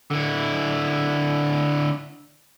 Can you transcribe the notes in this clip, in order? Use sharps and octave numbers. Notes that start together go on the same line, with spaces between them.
D3 E4